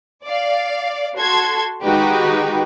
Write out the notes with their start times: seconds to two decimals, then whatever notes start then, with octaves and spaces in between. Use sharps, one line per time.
0.24 D5 F5
1.16 F#4 A4 C6 G#6
1.83 D#3 G#3 D#4 F#4 G4 B4